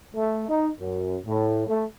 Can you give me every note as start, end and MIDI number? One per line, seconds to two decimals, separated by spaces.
0.15 0.46 57
0.49 0.70 63
0.80 1.18 42
1.26 1.65 45
1.67 1.86 57